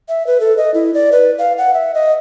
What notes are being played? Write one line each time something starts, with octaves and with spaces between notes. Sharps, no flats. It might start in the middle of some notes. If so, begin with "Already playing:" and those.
E5
B4
A4
D#5
E4
D5
B4
F5
F#5
E5
D#5